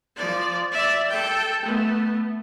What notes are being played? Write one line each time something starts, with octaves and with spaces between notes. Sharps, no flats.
F3 D5
D5 E5
A4 G5
A3 B3